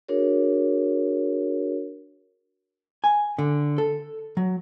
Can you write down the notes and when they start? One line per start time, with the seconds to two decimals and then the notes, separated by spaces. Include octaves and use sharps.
0.09 D4 F#4 G#4 A#4 C#5
3.04 G#5
3.38 D3
3.78 A4
4.37 F#3